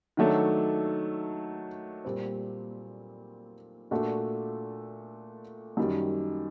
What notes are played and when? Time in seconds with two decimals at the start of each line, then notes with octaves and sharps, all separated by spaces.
0.17 D#3 F#3 A3 D4 A4
2.05 A#2 G3 C4
3.91 A#2 A3 D4 F#4 A4
5.77 F#2 D#3 G3